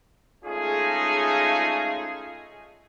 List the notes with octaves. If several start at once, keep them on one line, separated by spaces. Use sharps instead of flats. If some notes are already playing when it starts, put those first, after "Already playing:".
G#3 A3 C#4 D#4 F4 G#4